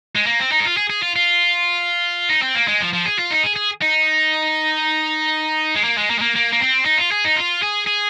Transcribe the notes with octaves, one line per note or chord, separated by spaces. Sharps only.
G#3
A#3
C4
D#4
G#4
F4
G#4
G#4
F4
F4
D#4
C4
A#3
G#3
F3
F3
G#4
F4
D#4
G#4
G#4
D#4
G#3
A#3
G#3
A#3
G#3
A#3
A#3
A#3
C4
D#4
F4
G#4
D#4
F4
G#4
G#4